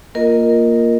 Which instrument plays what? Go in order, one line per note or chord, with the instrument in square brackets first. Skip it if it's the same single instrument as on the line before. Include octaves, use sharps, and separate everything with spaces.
[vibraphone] A#3 F4 A#4 D#5